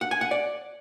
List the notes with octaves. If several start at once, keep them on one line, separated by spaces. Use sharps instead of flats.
F#5
G#5
F#5
D5